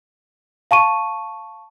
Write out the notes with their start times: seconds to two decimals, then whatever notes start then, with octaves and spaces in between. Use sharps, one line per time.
0.71 F5 A5 C#6 D#7